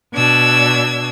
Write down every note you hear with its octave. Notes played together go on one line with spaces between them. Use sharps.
B2 D4 E6 G#6